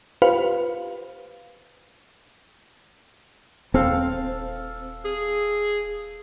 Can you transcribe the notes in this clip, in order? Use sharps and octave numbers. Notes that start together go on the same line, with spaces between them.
F4 G4 B4 C5 F5
D#1 C4 A4 F5
G#4